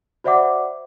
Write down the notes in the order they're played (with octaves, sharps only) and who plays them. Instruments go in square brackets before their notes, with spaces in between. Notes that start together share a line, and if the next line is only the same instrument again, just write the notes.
[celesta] F#4 C5 D5 E5 F#5 D6